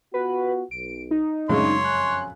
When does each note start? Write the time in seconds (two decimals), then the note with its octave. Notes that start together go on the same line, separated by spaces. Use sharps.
0.14 B3 F4 F#4 B4
0.71 B1 D7
1.11 D#4
1.49 F#2 C#3 G#3 C#4 D4 C#5 C6
1.85 F2 G#5 F#6